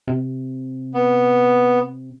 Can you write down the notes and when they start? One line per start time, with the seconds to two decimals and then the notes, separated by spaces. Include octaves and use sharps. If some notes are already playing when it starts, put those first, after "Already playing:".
0.08 C3
0.94 B3